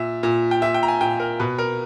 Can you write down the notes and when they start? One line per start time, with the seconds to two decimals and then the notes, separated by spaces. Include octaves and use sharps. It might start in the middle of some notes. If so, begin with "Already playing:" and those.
Already playing: A#2 E5
0.23 A#2
0.51 G5
0.62 A#2 E5
0.74 G5
0.83 A#5
0.88 G#5
1.01 A#2 G5
1.20 A#4
1.40 B2 B4
1.58 A#4